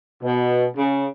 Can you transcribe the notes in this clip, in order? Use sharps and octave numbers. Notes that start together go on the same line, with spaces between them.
B2
C#3